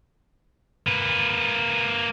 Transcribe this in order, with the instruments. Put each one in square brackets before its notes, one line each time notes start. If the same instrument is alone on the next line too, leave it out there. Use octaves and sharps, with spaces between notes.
[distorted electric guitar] A#3 B4